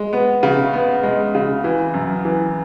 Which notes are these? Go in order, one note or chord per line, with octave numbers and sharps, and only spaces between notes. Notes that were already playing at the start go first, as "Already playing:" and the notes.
Already playing: G#3
B3
C#3
B3
G#3
C#3
E3
F#2
E3